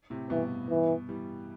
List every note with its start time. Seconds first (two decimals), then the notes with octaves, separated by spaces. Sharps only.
0.10 A2 C3
0.30 G2 B2 E3
0.70 E3
1.09 E3 G3